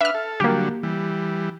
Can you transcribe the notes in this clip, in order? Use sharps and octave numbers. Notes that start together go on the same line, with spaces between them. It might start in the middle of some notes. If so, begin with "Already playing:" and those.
D4 B4 E5 F#5 F6
A4
D3 F#3 G3 A#3 G4
E3 G3